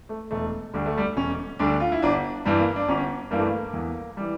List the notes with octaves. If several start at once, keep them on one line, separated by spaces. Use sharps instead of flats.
A3
E1 A3
D2 D3 G3
A3
G3
E1 C#4
D2 D3 G3 D4
F4
E4
G1 D4
G2 E3 G3
A#3
D4
G1 C#4
G2 E3 G3 A#3
A3
A#3
E2
E3 G3